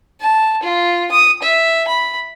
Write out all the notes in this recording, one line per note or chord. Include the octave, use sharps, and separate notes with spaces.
A5
F4
D#6
E5
B5